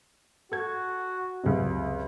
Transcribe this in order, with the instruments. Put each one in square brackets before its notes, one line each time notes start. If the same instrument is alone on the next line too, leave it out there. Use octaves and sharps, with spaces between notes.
[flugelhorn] F#4 [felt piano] A4 G#6
[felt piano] C#2 F#2 C3